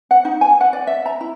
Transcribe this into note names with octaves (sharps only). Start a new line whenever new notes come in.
F#5
D#4
G#5
F#5
D5
E5
A#5
E4